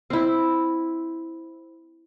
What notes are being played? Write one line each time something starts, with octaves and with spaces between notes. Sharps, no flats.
C4 E4